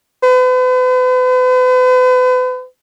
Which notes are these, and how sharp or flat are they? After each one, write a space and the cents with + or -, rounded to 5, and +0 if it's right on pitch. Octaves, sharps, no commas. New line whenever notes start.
B4 +40